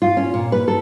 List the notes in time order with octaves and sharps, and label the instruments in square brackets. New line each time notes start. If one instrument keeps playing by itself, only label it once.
[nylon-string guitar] F4
C#4
A#2
B4
A4